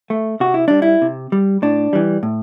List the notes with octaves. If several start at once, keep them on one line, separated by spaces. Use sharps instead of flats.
A3
C3 F#4
E4
G3 D4
E4
C3
G3
A2 D4
E3 G3
A2